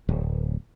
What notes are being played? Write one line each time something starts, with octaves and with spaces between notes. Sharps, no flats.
D1